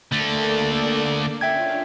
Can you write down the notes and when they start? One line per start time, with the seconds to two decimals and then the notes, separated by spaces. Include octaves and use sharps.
0.12 D3 A3 A#3 A4 D5
1.41 C#4 D4 F4 E5 G5 G#6